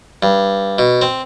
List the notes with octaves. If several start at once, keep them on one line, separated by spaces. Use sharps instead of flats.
G2
B2
C4